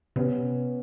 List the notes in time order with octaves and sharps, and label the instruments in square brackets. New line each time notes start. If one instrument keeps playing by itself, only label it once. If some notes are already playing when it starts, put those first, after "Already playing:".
[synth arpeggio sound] C3 [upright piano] B3 C#4